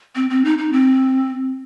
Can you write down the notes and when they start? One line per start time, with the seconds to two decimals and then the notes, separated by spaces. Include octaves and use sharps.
0.15 C4
0.30 C4
0.45 D#4
0.58 D#4
0.73 C4